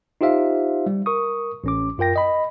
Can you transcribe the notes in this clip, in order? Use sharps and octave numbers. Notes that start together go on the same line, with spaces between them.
D#4 F4 G4 C5 E5 F5
G3
A#4 C#6 D#6
A1 C#4 D6
F#2 F4 A#4 G5 A#6
D#5 B5